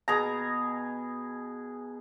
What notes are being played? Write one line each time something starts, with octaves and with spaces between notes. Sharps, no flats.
B2 G#4 A#5